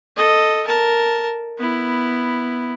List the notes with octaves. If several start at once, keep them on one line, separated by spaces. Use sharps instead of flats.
A4 D#5
A#4 A5
B3 E4